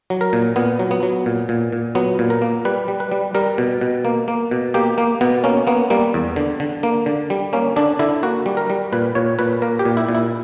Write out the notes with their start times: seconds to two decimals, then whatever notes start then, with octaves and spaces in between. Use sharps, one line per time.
0.10 F#3
0.21 A#4
0.33 A#2
0.56 A#2 B3
0.79 F#3
0.91 B3
1.03 F#3
1.26 A#2
1.49 A#2
1.72 A#2
1.95 F#3 B3
2.19 A#2
2.30 A#4
2.42 A#3
2.65 G3 B4
2.88 G3
3.00 B4
3.11 G3
3.35 G3 A#4
3.58 B2
3.81 B2
4.05 A#3
4.28 A#3
4.51 B2
4.74 A#3 G4
4.98 A#3
5.21 B2 B3
5.44 A#3 C#4
5.67 A#3 B3
5.90 G3 A#3
6.14 E2
6.36 D3
6.60 D3
6.83 A#3
7.06 D3
7.30 G3
7.53 A#3 C#4
7.76 D3 D4
7.99 D3 E4
8.23 A#3 F#4
8.46 G3
8.57 A#4
8.70 G3
8.92 A#2 B4
9.15 A#2 C#5
9.39 A#2 B4
9.62 A#3 A#4
9.79 G4
9.85 A#2
9.97 E4
10.09 A#2
10.15 E4